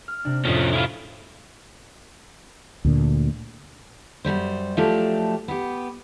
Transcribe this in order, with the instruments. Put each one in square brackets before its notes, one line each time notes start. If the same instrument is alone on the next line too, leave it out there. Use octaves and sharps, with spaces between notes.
[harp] F6
C3 D4
[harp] F2 A2 G#3 [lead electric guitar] F3 C#4
[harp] C#4 B6 [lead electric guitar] E4 F4
[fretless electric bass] D2 A#2 D3
[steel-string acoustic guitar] F#2 A#2 G3 C5
F3 F#3 A3 D4 G4
B3 G4